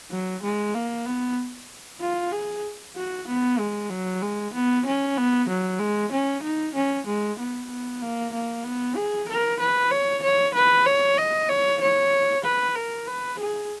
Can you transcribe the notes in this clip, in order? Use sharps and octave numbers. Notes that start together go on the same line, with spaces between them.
F#3
G#3
A#3
B3
F4
G#4
F#4
B3
G#3
F#3
G#3
B3
C#4
B3
F#3
G#3
C#4
D#4
C#4
G#3
B3
B3
A#3
A#3
B3
G#4
A#4
B4
C#5
C#5
B4
C#5
D#5
C#5
C#5
B4
A#4
B4
G#4